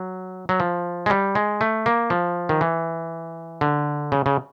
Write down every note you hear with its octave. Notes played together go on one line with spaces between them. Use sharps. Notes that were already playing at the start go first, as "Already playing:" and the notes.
Already playing: F#3
F#3
F3
G#3
G3
G#3
A3
A#3
F3
D#3
E3
D3
C#3
C#3